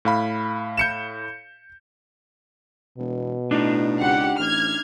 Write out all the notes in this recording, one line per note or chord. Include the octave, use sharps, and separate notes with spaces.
A2 F5 B5
G6 C#7 E7
E1 B2
A2 D4 D#4
C#2 G4 F#5
A1 F6 G#6